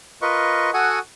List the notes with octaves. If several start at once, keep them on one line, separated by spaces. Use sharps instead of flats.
F4 A#4 B4 D#5 C#6
F#4 A4 F#5 G#5 C#6 D#6